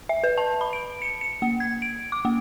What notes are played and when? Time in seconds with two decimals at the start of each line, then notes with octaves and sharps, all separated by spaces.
0.09 E5
0.24 B4
0.38 A5
0.61 B5
0.73 D7
1.02 C#7
1.21 C#7
1.42 A#3
1.60 G#6
1.82 D7
2.12 D6
2.25 A#3